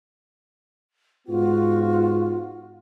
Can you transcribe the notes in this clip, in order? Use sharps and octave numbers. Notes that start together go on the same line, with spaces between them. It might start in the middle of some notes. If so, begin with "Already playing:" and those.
G#2 B3 F4 F#4